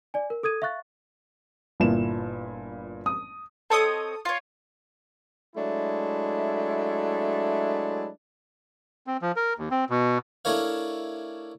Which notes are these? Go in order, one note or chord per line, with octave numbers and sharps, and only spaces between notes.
D5 G#5
A#4
A4 D#6 G#6 D#7
E5 F5 C#6 F#6 A6
G1 A#2 E4 E7
D#6
C4 A4 C#5 D#5 D#6
F4 C#5
F#3 G#3 A3 D4 E4
C4
F3
A#4
D#2
C4
B2
A3 D4 E4 A#4 C#5 F5